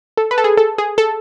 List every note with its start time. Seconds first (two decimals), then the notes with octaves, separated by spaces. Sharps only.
0.17 A4
0.31 B4
0.38 A4
0.44 G#4
0.57 A4
0.78 G#4
0.98 A4